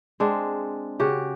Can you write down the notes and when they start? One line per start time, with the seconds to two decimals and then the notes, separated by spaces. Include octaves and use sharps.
0.20 G#3 C4 D4
1.00 C#3 F#4 G4